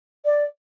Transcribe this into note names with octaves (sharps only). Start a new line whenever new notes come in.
D5